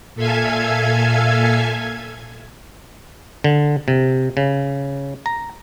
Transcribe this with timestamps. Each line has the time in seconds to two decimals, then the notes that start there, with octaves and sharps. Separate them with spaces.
0.15 A#2 A4 E5 F5 G#5 G#6
3.44 D3
3.88 C3
4.37 C#3
5.26 A#5